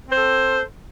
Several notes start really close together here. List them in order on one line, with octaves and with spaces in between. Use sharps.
C4 C5 A4